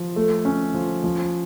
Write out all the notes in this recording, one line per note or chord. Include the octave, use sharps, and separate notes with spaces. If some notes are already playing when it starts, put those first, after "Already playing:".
Already playing: F3
A3
C#4
F3
F3